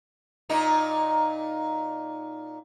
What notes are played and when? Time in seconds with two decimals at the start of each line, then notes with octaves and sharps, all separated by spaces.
0.49 A#2 D#4